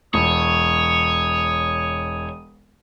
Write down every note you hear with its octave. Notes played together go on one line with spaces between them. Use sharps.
E1 C#5 D#6